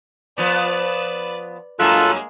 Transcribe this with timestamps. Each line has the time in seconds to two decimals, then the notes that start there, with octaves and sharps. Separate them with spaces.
0.38 F3 B3 B4 D5
1.79 G2 F#3 G#3 A#3 F4 A4 E5 F#6